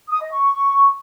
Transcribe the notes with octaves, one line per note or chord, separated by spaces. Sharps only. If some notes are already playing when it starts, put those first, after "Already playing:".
D#6
D#5
C#6